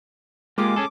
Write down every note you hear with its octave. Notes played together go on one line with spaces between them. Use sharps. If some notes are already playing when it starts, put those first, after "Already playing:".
G#3 A#3 F4 G4 D6
C#4 G#4 A4